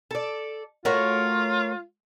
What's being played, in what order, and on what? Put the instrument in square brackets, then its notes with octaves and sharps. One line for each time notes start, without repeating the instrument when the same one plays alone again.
[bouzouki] A4 D5
[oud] A3 F#4 [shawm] F4 [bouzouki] A#4 C#5